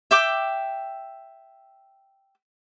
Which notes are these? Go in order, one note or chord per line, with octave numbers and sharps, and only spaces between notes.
E5 G5 D6